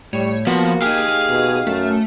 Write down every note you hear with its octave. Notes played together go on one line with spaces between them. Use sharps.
A2 G3 C#5
F3 A#3 B3 F#4
D#4 G4 G#4 F5
B2
F#2 A3